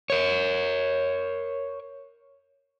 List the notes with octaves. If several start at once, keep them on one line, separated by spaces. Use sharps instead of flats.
A#4 C#5